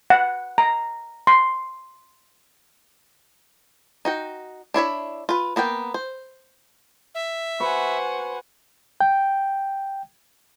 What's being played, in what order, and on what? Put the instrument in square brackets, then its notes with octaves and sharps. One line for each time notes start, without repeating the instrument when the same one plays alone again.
[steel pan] F#5
A#5
C6
[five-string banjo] D#4 F#4 G5
D4 E4 C#5 E5
F4 B4
A#3 B3 A#4 G5
C5
[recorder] E5
[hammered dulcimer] F#4 B4 [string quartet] C5 F#5 G#5
[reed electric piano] G5